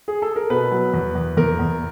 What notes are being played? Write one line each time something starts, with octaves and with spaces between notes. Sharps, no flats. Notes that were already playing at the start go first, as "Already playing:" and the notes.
G#4
A4
A#4
B2 B4
F#3
E2
E2
E2 A#4
E2